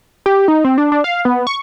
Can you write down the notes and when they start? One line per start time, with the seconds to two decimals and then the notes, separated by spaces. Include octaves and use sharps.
0.26 G4
0.48 D#4
0.64 C4
0.78 D4
0.92 D4
1.04 F5
1.25 B3
1.47 C#6